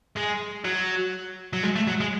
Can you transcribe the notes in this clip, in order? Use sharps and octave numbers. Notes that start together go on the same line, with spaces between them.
G#3
F#3
F#3
G#3
A3
F#3
G#3